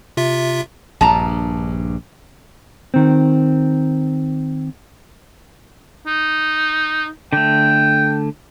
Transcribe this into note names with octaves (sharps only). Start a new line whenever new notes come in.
C3 F4 E5
A#1 G2 A5 A#5
D#3 C4
D#4
D3 A3 G5